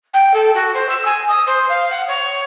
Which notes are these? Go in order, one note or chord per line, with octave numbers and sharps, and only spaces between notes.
G5
A4
F#4
C5
E6
G#5
D#6
C5
F5
F#5
C#5